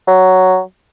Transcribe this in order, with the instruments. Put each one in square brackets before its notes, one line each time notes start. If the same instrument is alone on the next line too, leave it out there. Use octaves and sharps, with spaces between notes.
[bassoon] F#3